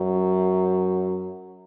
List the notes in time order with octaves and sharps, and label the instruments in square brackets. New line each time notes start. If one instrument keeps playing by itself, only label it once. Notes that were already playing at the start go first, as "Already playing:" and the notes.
Already playing: [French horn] F#2